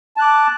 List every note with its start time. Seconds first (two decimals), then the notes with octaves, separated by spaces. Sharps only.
0.17 A5
0.19 F#6
0.22 D6